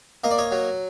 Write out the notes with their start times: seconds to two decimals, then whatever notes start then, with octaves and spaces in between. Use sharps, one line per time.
0.24 A#3 D#5
0.31 D5
0.38 C#5 D#5
0.52 F#3